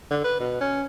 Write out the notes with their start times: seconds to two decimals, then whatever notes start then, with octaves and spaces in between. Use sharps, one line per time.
0.10 D3
0.24 B4
0.40 B2
0.61 C#4